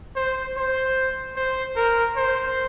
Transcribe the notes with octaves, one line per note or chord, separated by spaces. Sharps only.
C5
C5
C5
A#4
C5